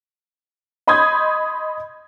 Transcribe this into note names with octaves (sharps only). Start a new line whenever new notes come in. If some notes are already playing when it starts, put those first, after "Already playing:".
D#5 B5 C6 D#6 G6 G#6